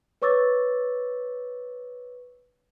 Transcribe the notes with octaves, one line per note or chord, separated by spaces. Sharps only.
B4 C#5 C#6 D6 E6 A6